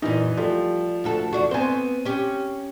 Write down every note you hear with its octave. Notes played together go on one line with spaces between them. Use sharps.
F#2 A#2 E3 D#4
F3 G3 A3
D2 F#4 A4
E2 D4 F#4
B3 C4 C5 G#5
C#4 G4